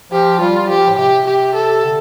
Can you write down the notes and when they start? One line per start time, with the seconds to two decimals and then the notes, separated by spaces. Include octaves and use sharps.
0.12 F3 G4
0.40 G3 F4
0.69 F3 G4
0.88 A2
0.98 C3 G4
1.27 G4
1.55 A4
1.84 D3